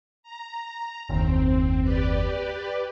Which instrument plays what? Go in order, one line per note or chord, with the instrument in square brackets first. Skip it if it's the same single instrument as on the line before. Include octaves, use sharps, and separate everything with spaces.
[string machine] A#5
[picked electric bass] F#1 D#2 [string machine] C4
[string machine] G4 B4 D5